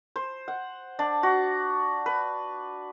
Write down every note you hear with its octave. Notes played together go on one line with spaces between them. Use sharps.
C5
F#5
D4
F#4
B4